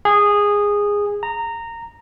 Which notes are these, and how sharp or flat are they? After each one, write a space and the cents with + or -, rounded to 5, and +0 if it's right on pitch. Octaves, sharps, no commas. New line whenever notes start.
G#4 -15
A#5 -15